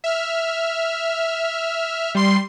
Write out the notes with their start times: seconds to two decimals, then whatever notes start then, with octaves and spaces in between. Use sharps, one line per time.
0.04 E5 F6
2.15 G3 C6 C7